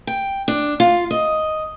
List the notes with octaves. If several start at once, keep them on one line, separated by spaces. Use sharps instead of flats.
G5
D4
F4
D#5